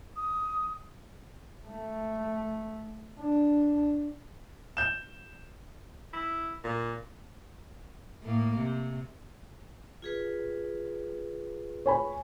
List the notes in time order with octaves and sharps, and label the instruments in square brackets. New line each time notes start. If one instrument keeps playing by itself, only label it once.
[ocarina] D#6
[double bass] A3
D4
[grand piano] G6 E7
[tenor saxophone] E4
A#2
[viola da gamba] A2 A#3
C3
[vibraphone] F4 G#4 B4
[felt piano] C#5 G#5 B5